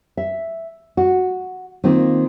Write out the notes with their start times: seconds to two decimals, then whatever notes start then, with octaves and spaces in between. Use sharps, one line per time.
0.17 E5
0.97 F#4
1.84 D#3 A#3 C4 F4